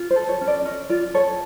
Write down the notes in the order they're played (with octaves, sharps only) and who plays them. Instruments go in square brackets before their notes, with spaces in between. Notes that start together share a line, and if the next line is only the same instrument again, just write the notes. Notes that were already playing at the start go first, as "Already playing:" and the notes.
Already playing: [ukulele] F4
C5
A4
C#5
C#4
D5
C#4 D#5
F4 D5
A4 C#5